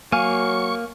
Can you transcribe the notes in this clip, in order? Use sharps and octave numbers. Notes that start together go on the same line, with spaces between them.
F#3 A#3 F5 G#5 C#6